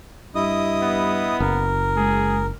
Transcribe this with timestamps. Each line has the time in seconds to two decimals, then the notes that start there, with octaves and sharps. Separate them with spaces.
0.35 G2 E4 D#5 D#6
0.83 B3
1.40 F#1 A#4
1.97 G#3 G#4